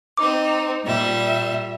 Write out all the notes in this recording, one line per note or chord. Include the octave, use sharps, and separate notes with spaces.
C4 D#4 D6
A#2 G3 E5